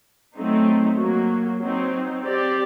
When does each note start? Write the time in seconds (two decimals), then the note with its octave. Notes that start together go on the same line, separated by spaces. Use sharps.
0.36 F#3 A3 C4 D#4
0.98 F#3 A#3 F#4
1.60 F#3 C4 D#4
2.22 C4 G4 D5